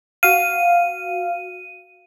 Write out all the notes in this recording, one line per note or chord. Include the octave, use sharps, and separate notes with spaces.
F#4 F5 D#7